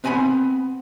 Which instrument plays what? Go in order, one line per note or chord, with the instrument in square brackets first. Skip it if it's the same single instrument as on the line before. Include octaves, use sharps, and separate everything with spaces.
[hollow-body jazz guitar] B3 C4 G#5 A5 B5